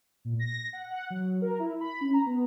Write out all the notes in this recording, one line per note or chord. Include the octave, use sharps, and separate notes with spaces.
A#2
A#6
F#5
F#5
F#3
A#4
E4
B5
C#4
A#5
B3